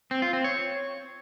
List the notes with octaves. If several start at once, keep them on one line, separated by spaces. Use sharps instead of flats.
C4
F4
C4
C#5